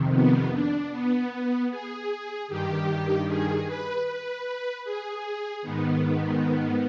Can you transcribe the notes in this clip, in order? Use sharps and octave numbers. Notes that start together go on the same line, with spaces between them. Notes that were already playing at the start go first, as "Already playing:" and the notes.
Already playing: F2 C3 D#3
B3
D4
B3
G#4
G2 D#3 G4
G#4
B4
B4
G#4
G#2 D#3 B3